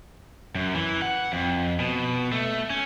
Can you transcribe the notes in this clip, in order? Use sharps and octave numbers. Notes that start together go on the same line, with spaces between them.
F#2
E3
F#5
F2
B2
A3
C#4